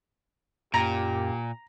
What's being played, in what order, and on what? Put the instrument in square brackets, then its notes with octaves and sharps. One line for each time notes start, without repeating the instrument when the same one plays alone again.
[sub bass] F#2 [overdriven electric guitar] A#2 [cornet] G4 [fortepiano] A#5